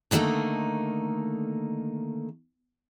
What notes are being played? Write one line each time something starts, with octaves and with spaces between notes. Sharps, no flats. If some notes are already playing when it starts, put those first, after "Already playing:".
D3 D#3 G3 A3 A#3 D#4